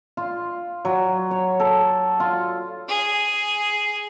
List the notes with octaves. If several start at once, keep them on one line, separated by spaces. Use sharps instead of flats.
F4
F#3
C#5
A4
F4
G#4